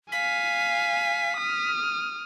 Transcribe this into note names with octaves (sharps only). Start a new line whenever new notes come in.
F5 G#5 B6
D#6 F6